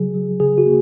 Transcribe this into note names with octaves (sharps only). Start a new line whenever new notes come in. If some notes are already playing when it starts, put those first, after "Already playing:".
Already playing: C#3 F#3 G#4
F#3
C#3 G#4
F#4
A#3